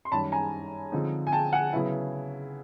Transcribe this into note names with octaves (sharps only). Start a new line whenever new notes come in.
C6
F#2 D#3 G3 A5 B5
G#5 A#5
D3 F3 G#3 C4 D#4
G#5
G5 A5
F#5 G#5
C#3 F#3 B3 E4